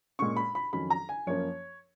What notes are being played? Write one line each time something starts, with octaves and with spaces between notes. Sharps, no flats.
A#2 G#3 C#4 C#6
B5
B5
F2 D#3 F#3 C#4 B5
A#5
G#5
F#2 F3 A#3 C#4 C#5